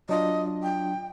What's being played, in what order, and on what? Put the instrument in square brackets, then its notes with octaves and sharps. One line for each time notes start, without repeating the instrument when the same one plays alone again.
[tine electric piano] F#3 D4 F4 [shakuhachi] D#5
[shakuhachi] G5